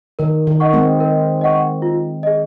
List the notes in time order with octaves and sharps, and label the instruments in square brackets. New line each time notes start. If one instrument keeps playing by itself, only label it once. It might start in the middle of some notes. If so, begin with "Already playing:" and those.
[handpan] D#3 [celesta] A#4
[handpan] D#3
[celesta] D#5 F#5 C#6
[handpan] G#3 C4
[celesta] A#4
D#5 F#5 C#6
F4
G#4 D#5